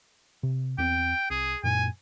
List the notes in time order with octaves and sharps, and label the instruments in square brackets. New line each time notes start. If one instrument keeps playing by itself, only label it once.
[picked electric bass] C3
[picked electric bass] E2 C4 [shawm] G5
[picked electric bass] C2 [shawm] G#4
[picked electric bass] F#2 A#2 [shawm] G#5